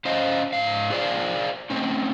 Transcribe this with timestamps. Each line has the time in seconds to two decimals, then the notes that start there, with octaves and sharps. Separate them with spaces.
0.05 C#4 C5 D#5 F5
0.53 G#2 F5
0.90 F4 G#4 C5 D5 F5
1.70 A3 C4 C#4